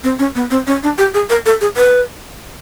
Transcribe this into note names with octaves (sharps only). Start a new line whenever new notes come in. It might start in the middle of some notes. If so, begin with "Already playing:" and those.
C4
C#4
B3
C4
C#4
D4
G4
G#4
A#4
A4
G#4
B4